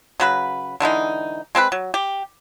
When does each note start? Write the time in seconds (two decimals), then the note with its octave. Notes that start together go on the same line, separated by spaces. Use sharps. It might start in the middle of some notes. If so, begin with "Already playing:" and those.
0.20 C#3 F#3 B4
0.80 D3 E3 G#3 D#4
1.55 G#3 C4 G#4 B4
1.72 F#3
1.94 G4